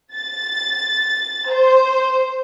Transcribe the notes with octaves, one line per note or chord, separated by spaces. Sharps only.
A6
C5